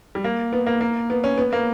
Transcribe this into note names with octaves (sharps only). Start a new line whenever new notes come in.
G3
A#3
B3
A#3
A#3
B3
C#4
B3
A#3